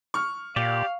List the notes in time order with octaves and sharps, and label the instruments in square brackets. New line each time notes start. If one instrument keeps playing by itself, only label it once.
[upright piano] C#6 F6
[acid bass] A#2 [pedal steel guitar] G4 D5 [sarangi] F5